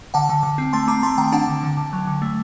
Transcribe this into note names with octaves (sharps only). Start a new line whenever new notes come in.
D3 F#5 A5
D3
D3
C4
A3 A5 C6
C4 A#5 D6
A3 A5 C6
D#3 G5 A#5
D4 F#5 A5
D3
D3
D3
F#3
D3
A3